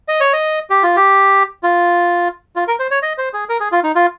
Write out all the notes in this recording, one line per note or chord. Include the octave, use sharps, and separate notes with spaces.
D#5
C#5
D#5
G4
F4
G4
F4
F4
A#4
C5
C#5
D#5
C5
G#4
A#4
G#4
F4
D#4
F4